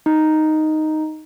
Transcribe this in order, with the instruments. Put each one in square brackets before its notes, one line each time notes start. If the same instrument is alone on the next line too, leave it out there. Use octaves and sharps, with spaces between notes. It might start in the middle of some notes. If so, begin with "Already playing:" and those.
[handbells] D#4